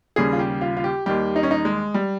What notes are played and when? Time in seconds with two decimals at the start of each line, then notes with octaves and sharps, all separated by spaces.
0.16 D#2 C#3 G3 G#4
0.33 F4
0.39 G4
0.61 F4
0.77 F4
0.84 G4
1.06 D#2 D#3 G3 G4
1.36 D#4
1.43 C#4
1.51 D#4
1.65 G#3
1.94 G3